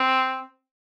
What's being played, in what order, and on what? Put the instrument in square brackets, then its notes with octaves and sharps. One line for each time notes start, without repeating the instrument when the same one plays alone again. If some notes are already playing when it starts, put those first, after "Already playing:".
Already playing: [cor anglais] C4